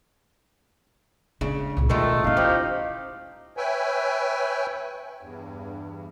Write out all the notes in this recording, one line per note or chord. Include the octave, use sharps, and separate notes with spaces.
C#3 G#3 D4
C2 A#2
B2 D#3 G#3 A3 F4
C#4 D#4 E4 F5
F3 G4
B4 C#5 E5 G5 G#5
E2 G2